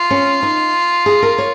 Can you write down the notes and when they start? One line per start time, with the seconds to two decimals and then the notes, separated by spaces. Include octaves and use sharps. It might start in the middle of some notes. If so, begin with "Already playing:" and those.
Already playing: F4
0.11 C#4
0.43 D#4
1.06 G#4
1.23 A#4
1.38 C#5